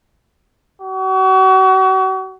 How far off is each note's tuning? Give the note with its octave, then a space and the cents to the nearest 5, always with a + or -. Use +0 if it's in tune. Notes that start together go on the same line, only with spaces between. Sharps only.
F#4 +35